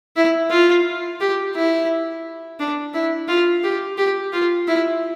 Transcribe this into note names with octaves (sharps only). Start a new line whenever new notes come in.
E4
F4
G4
E4
D4
E4
F4
G4
G4
F4
E4